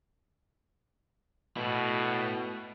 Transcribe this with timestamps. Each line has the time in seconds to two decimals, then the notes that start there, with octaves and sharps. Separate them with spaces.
1.57 B2 A3 E4